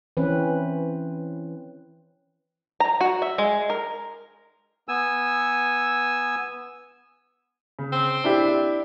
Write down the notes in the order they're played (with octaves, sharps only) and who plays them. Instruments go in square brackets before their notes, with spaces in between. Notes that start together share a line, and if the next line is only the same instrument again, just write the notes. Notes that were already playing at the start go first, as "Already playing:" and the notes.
[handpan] E3 C4 C#4 B4
[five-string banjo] A#5
F#4
E5
G#3
A#4
[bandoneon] B3 G#5 E6
[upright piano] C#3
[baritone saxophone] C4
[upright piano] D4 E4 G4